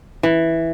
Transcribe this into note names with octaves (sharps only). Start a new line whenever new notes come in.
E3